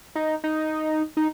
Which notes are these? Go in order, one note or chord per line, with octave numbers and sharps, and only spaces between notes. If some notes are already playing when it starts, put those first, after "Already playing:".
D#4
D#4
D#4